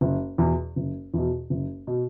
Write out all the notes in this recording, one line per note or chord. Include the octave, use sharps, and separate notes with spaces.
F#1
E2 B2
F#1
E2 B2
F#1
B2